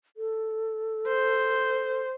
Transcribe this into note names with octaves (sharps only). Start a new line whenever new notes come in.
A4
C5